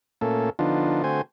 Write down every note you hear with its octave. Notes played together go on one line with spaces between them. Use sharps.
A#2 A3 A#3 C#4 A4
D3 F3 B3 D4 D#4 F4
D3 A3 C4 F#4 C5 G#5